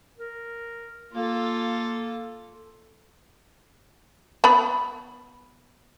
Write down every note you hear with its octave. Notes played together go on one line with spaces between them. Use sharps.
A#4
A#3 F4 A4
B3 B5